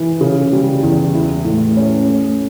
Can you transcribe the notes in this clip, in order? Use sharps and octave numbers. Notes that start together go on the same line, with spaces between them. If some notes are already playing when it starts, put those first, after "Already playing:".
Already playing: E3
C#3
G3
E2
E4
A2
C#4
A3